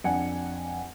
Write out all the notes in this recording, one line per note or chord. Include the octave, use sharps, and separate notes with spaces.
F2 D4 F#5 G#5 C#7